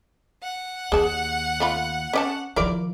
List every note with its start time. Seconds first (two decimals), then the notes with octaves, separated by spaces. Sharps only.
0.42 F#5
0.92 D#2 G#4 A5
1.60 A3 F4 B5
2.13 C#4 D5 A5
2.56 D#3 F3 E4 A#4 D5